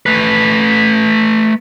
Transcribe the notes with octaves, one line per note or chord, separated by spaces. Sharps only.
A3 B4